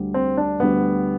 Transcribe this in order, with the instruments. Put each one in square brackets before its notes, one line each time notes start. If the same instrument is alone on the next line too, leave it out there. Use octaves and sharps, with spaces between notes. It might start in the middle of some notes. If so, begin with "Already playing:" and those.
Already playing: [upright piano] D2 D3 G3
[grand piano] C4
D4
[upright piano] D2 D3 G3 [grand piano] B3